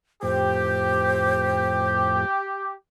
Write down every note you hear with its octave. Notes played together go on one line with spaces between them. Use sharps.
F2 A2 G4 C5